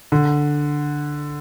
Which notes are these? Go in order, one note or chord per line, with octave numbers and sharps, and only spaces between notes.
D3